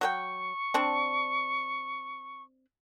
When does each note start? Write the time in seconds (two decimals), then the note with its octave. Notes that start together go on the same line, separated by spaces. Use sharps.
0.01 F#3 A#4 G5 C#6
0.74 C4 D4